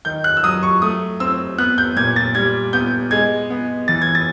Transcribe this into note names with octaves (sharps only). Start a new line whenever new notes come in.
D#3 G6
F#6
E6
F#3 D#6
C#6
A3 D#6
C4 E6
B3 F#6
G6
A#2 G#6
A6
G3 G#6
B3 G6
G#3 G#6
B3
E3 A6
G#6
A6